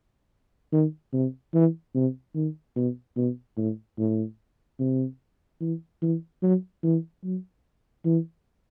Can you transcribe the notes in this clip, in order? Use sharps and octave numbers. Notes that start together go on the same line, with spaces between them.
D#3
C3
E3
C3
D#3
B2
B2
A2
A2
C3
E3
E3
F#3
E3
F#3
E3